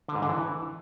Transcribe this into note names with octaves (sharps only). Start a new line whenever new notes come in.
D3
G#2
D3
E3